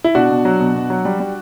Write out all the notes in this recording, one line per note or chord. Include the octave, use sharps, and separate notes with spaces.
E4
B2 D4 F#4
B2
F#3
B2
B2
F#3
G3
G3